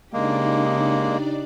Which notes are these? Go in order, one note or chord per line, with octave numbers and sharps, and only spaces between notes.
C#3 G#3 A#3 D4 D#4 G4 D5